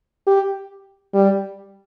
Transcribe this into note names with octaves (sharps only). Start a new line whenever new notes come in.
G4
G3